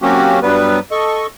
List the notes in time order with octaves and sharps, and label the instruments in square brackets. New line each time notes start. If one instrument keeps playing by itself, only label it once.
[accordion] F#3 A#3 C4 C#4 F#4 G4
G2 F#3 G3 B3 B4
A4 D#5 C#6